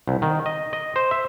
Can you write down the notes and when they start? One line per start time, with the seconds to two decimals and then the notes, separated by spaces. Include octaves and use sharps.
0.08 C2
0.22 D#3
0.46 D#5
0.73 D#5
0.96 C5
1.11 E5